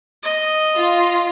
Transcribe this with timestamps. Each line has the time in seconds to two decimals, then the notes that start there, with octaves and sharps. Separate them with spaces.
0.23 D#5
0.76 F4